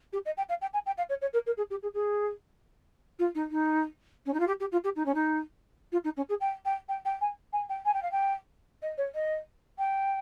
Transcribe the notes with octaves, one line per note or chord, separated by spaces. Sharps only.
G4
D#5
G5
F5
G5
G#5
G5
F5
C#5
C#5
A#4
A#4
G#4
G4
G#4
G#4
F4
D#4
D#4
C#4
D#4
F4
G4
G4
F4
G4
D#4
C#4
D#4
F4
D#4
C#4
G#4
G5
G5
G5
G5
G#5
G#5
G5
G#5
G5
F5
G5
D#5
C#5
D#5
G5